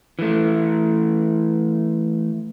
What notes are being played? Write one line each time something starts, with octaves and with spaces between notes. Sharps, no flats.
E3 A3